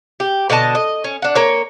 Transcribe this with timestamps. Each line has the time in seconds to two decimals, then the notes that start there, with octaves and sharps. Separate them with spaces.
0.20 G4
0.50 B2 D3 D#5 A5
0.75 D#5
1.04 C#4
1.22 D4 F#5
1.35 A#3 C#5